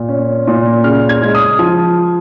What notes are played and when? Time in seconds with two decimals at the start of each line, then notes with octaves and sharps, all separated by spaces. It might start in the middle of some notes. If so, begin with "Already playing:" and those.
Already playing: A#2
0.09 C#4
0.47 A#2
0.84 C#3 F6
1.09 G#6
1.22 G#3
1.35 D#6
1.59 F3